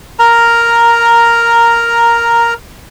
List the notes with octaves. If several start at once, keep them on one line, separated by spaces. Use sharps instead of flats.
A#4 A#5